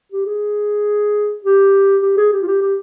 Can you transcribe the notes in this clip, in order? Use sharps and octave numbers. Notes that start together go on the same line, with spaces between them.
G4
G#4
G4
G4
G#4
G4
F4
G4
G4